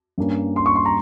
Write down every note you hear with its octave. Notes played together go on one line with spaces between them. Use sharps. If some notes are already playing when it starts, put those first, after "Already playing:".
G2 G3 A#3 C#4
C6
C#6
C6
A#5